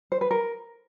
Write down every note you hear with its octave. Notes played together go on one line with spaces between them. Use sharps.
C5
B4
A#4